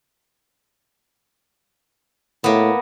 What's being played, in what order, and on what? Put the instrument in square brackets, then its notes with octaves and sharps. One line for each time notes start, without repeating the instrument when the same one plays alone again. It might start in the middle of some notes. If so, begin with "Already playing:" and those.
[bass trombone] A2 [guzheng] A#3 B3